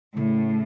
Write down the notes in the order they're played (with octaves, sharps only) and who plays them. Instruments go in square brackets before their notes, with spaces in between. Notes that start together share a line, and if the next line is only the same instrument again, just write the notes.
[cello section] A2 [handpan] C#3